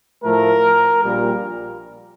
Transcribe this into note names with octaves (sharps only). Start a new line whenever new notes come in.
A2 F3 A3 A#4
A#1 A#2 G3